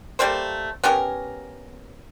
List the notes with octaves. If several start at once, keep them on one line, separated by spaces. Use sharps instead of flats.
G3 A3 A#3 C5
B3 C#4 G4 A#4